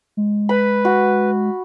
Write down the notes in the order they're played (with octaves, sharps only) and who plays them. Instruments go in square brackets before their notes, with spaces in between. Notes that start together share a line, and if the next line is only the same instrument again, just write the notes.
[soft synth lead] G#3
[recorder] B4 [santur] B5
[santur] F#4